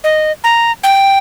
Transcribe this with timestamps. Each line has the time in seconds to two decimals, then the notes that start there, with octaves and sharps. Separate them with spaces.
0.04 D#5
0.44 A#5
0.83 G5